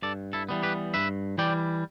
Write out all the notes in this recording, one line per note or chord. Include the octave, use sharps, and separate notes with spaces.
G2 A4 D5
E4 A4
E3 G3 B3
G4 B4
G2 B4 E5
E3 G3 D5 G5